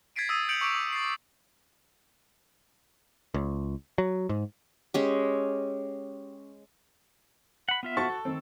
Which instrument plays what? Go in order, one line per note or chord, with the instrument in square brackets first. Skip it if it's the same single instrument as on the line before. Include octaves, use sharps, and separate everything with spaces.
[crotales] G#6 A6 B6 C7 D7 D#7
D#6 E6 G#6 A6 C7 D#7
G6 G#6 C#7 D7 F7 F#7
C#6 D6 D7 F7
D6
A6 C7
[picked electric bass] C#2
F#3
G#2
[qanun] G#3 C#4 G4
[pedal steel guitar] F#5 B5
B3 F4 E5
[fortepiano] F#4 C5 [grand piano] A5 C#6 A6
[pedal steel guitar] A4
[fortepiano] D#3 C4